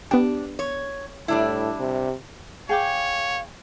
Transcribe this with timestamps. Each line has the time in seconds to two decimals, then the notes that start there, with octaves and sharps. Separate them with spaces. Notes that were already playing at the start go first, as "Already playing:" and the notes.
0.11 B3 D4 G4
0.59 C#5
1.28 A2 G3 D4 E4
1.79 C3
2.69 G#4 C#5 F5 G5 D6